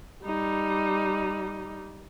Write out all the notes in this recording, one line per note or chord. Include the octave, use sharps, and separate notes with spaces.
G3 D#4